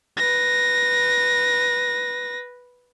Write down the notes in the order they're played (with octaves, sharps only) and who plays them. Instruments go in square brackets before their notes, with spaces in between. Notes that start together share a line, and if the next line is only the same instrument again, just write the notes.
[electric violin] B4 A#6